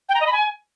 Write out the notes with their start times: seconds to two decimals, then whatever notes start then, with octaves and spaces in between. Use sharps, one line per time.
0.09 G5
0.15 A#5
0.21 D#5
0.27 B5
0.33 G#5